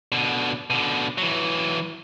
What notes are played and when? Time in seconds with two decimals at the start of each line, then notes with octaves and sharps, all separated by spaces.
0.12 B2 D3
0.70 B2 D3
1.18 E3 F#3